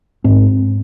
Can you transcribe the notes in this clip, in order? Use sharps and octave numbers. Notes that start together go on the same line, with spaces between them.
G#2 C4